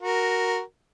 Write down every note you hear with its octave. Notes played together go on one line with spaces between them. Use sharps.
F#4 A#4